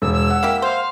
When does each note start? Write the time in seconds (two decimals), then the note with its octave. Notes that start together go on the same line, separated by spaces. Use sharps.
0.02 E1 E6
0.13 E6
0.30 F#5
0.43 A#3 E4 G4
0.62 C5 F5